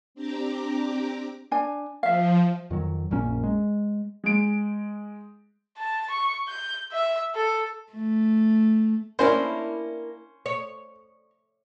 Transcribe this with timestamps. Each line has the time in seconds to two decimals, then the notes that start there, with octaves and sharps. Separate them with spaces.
0.15 C4 D4 G4 A#5 D6
1.51 D4 G#5
2.03 F3 E5 F5
2.71 F2 D#3 F#3
3.11 A#1 F#2 A#3 C#4
3.44 G#3
4.24 G#3 D7
5.77 A5
6.10 C#6
6.48 G6
6.92 E5
7.35 A4
7.93 A3
9.19 A#3 C#4 D4 E4 C5
10.46 C#5